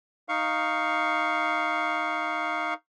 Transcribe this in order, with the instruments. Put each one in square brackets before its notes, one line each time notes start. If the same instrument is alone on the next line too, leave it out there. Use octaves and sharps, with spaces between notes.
[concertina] D#4 F5 C#6